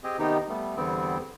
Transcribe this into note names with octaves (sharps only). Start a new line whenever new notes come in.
C4 G4 G#4 D#5
C3 D#3 B3 D#4 G4
G3 A3 B3
E2 D3 G3 B3 C4